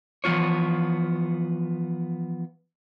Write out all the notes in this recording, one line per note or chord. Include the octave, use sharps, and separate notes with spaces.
E3 F3 B3 F4 C#5